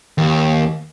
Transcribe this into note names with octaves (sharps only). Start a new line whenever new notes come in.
D#2